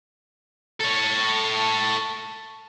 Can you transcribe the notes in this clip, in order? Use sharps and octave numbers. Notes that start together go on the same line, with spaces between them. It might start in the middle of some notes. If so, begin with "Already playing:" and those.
A4 C#5